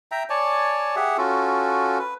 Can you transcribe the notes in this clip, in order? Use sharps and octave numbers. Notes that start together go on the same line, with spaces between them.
E5 G5 A#5
C#5 D5 G#5 A5
G4 G#4 E5 F#5
C#4 F4 F#4 A4
B4